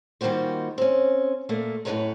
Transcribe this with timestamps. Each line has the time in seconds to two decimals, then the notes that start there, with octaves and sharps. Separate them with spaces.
0.21 D#3 G3 A#3 F4 F#4 C5
0.78 C4 C#4
1.49 A#2 A3 A#3
1.85 F#2 A2 C4 B4 C#5 A#5